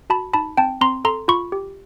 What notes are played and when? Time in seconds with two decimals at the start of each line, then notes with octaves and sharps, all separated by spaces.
0.10 F#4 A5 B5
0.33 D#4 A5 B5
0.57 C4 G5 A5
0.81 C4 A#5 C6
1.05 A4 A#5 C6
1.28 F4 B5 C#6
1.52 G4